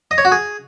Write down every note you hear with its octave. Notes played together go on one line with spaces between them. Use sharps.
D#5
C#5
F#4
G#4